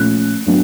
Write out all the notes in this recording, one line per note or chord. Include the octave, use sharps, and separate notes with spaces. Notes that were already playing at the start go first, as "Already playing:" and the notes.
Already playing: A#2 F3 A3 C#4 F#6
F#3 B3 D4